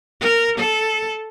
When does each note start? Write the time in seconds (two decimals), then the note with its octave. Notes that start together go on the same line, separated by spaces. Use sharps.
0.21 A#4
0.58 A4